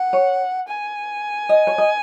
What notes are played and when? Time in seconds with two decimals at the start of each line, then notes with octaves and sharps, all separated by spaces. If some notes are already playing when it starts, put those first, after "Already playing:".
Already playing: F#5
0.13 C#5
0.68 G#5
1.49 D#5
1.67 C#5
1.78 D#5